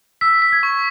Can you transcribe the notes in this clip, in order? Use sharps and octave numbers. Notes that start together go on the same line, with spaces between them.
E6 B6
B6
G#6
C#6